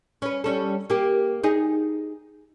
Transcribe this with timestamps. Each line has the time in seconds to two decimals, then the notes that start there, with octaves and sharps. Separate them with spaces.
0.22 C#4 B4
0.44 G3 C#4 A4
0.90 A#3 G4
1.44 D#4 G#4